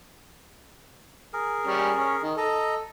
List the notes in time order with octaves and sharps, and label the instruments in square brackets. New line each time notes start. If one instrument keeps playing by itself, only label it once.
[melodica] G#4 A#4
[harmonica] G3 C#4
C#4
D#3
[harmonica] A4 [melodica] D#5 A#5